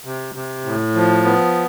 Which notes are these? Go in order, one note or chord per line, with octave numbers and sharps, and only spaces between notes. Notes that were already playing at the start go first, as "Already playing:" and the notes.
C3
C3
A2
F3
B3